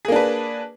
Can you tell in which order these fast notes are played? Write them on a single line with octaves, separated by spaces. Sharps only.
G#4 A#3 D4 B4